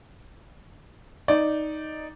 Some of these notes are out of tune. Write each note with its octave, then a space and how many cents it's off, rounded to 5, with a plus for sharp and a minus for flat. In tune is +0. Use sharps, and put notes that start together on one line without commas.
D#4 +0 D5 +0